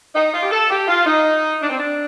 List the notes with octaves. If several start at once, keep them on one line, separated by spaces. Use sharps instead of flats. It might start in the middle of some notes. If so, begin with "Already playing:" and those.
D#4
F4
G4
A4
G4
F4
D#4
D4
C4
D4